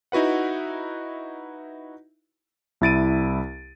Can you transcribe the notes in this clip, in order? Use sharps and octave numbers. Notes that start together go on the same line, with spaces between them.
D#4 E4 F#4 B4 F#5
C2 E4 A6 D7 D#7